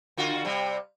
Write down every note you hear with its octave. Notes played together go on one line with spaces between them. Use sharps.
D3 F4 F#4
C3 G3